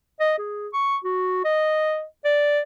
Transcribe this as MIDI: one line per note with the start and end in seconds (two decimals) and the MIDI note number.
0.20 0.34 75
0.38 0.68 68
0.73 0.97 85
1.04 1.40 66
1.45 2.04 75
2.25 2.60 74